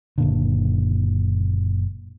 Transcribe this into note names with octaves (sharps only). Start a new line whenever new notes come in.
F#1 A#2 D3